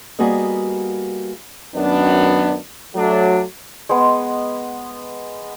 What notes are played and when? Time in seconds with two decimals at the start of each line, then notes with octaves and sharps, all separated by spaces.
0.19 G3 A#3 B3 F#4 G#4 D#5
1.75 F#2 D#3 B3 D4
2.95 F#3 A3 D4
3.89 G#3 B3